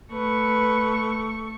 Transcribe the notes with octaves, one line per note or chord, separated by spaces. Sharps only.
A3 B4 C#6